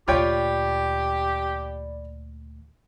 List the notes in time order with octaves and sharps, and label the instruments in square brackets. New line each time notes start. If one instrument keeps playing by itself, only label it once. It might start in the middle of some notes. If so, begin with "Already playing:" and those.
[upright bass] D2 A#2 [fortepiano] F4 C#5 G5 [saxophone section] G4 [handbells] D5 B5